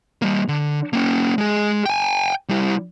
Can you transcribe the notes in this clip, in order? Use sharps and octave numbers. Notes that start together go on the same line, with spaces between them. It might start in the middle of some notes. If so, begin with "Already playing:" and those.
G3 A#3
D3
A#3 C#4
G#3 G#4
G5 G#5
G3 E4